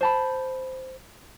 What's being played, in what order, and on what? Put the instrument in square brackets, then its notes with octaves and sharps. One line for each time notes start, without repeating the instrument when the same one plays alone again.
[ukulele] C5 A5 B5